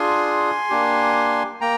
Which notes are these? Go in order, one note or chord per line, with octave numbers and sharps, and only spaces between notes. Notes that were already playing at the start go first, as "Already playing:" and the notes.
Already playing: D4 F4 G#4 G#5 C6
A#3 D4 G4
A#3 G5 A#5